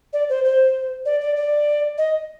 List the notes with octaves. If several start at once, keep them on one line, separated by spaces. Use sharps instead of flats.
D5
C5
C5
D5
D5
D5
D#5